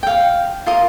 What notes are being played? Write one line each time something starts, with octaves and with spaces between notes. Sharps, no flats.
F5 G5
F4 A#4 D#5